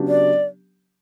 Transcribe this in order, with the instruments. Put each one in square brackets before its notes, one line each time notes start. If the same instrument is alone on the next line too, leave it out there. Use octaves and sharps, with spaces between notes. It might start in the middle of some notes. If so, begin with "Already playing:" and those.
Already playing: [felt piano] C#3 F#3 B3 D4 G4
[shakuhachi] D5